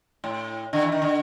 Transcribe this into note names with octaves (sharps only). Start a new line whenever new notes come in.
A2
D3
E3
D#3
D3